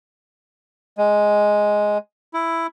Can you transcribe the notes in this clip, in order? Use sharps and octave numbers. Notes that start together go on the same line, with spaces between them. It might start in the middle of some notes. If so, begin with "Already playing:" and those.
G#3
E4